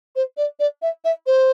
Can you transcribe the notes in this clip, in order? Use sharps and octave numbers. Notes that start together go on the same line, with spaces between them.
C5
D5
D5
E5
E5
C5